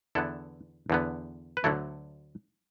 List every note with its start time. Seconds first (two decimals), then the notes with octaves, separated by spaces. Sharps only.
0.15 E2 D3 B3 E4 A4
0.90 E2 D3 B3
1.57 B4
1.64 D2 D3 F#3 A3 E4 A4